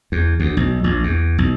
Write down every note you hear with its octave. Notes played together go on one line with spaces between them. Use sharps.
E2
D2
B1
A#1
E2
B1